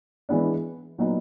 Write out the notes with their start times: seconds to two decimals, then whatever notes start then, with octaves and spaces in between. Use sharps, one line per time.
0.29 E3 G#3 B3 D4
0.98 A#2 F#3 B3 D#4